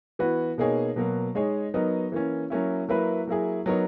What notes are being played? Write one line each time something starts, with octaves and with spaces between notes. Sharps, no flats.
E3 B3 F#4 B4
B2 A#3 D#4 G#4 C#5
B2 F#3 A#3
G#3 D#4 G#4 C#5
F#3 B3 D#4 A#4
E3 A#3 C#4
F#3 A#3 C#4 E4
F#3 A#3 E4 B4
F#3 A#3 E4 G#4
F#3 B3 D#4 A#4 C#5